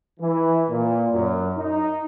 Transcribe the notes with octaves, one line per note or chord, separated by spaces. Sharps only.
E3
A#2
F#2
D#4